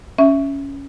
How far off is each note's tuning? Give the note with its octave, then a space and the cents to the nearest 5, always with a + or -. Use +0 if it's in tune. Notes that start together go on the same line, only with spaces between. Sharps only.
C#4 +5 E5 +0